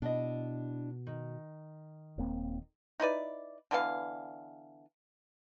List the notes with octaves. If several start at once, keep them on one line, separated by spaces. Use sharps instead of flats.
B2 D4 E4 D#5
D#3
D#1 A#3 C4
D#4 E4 B4 D5
D3 E3 B3 F5